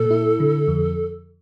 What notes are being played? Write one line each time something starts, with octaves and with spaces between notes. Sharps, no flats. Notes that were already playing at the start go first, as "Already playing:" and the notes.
Already playing: A#2 A4
E4
D3
F2